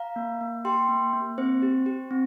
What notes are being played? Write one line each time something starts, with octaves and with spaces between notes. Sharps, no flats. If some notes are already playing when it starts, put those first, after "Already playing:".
Already playing: F5 A#5
A#3
A#3
G4 G5 C6
A#3
A#3
C4 C5
G4
G4
C4